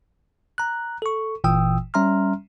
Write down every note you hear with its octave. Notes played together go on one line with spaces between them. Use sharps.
A#5 F#6
A4 C#6
G1 A#2 E3 G5 D#6 E6
G3 C#4 E5 A#5 C6 F6